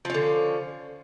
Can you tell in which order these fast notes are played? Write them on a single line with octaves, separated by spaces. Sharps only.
F3 C#4 D3